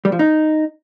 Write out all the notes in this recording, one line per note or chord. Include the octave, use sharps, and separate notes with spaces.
G3
F3
D#4